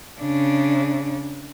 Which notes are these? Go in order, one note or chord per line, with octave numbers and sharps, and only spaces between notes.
C#3 D4